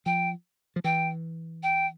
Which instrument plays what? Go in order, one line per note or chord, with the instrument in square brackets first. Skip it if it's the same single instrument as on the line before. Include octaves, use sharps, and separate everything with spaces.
[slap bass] F3 [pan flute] G5
[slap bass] F3
[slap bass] E3 [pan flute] G5
[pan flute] G5